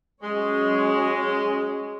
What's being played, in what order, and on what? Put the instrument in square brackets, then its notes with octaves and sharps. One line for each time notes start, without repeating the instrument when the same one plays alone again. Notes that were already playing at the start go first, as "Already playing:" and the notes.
[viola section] F#3 C#4 G#4 C#5 [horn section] G#3